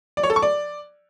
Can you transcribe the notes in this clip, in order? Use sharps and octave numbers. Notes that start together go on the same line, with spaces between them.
D5
C#5
A4
C#6
D5